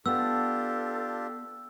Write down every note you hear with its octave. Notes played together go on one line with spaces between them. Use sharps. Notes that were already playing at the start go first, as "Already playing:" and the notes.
B3 D4 F4 G4 A4 E6